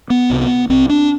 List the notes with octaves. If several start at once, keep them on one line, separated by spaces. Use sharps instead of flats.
B3
C2 C3
C2 C3 C4
D4